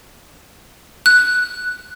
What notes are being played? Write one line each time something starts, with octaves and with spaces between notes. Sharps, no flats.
F#6